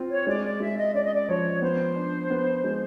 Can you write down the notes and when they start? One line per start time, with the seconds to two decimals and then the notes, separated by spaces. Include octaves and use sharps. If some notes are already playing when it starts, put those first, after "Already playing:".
Already playing: C4 F4
0.10 C#5
0.27 G#3 D5
0.44 D5
0.60 G#3 E5
0.77 D#5
0.94 C#4 D5
1.04 D#5
1.14 D5
1.28 F3 C#5
1.62 B3 C5
1.96 D4
2.30 B3
2.64 G#3